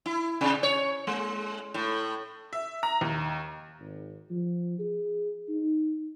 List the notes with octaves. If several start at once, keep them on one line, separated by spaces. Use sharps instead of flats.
E4
C3
C#5
G#3
A2
E5
A#5
D#2
G#1
F3
G#4
D#4